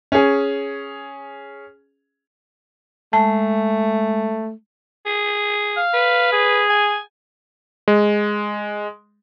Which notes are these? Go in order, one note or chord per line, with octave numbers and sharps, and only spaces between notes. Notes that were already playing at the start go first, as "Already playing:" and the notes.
C#4 G#4
G#3 A3 A5
G#4
F5
B4
G#4
G#5
G#3